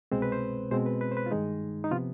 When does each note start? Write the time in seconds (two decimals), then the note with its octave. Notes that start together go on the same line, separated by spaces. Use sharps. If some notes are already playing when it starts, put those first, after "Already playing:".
0.12 C2 B2 G#3 C4 C5
0.22 B4
0.32 C5
0.71 B2 G#3 C4 C5
0.86 B4
1.01 B4
1.12 C5
1.17 B4
1.26 F4
1.31 G2 D#3 G#3 D#4
1.84 D#4
1.91 C3 F3 B3 F4